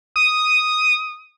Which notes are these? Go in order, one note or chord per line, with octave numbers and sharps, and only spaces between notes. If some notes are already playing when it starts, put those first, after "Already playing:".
D#6